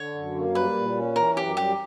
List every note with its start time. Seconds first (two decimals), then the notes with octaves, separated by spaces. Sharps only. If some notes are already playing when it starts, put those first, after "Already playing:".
Already playing: D3 C#5
0.15 F#2
0.35 A#3
0.54 G3 B4
0.75 A#2
0.96 C#4
1.16 E3 A#4
1.36 F#2 G4
1.57 G3 G4